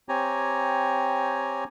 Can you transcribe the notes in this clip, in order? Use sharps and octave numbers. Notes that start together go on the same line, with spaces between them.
C4 G4 C#5 G#5 A#5